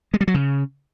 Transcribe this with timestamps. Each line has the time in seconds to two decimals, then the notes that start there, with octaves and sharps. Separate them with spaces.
0.14 G#3
0.21 G3
0.28 F#3
0.34 C#3